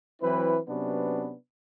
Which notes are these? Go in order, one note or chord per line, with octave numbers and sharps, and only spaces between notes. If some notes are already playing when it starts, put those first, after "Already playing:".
E3 F#3 C4 E4 B4
C3 F#3 B3 C#4 D4 B4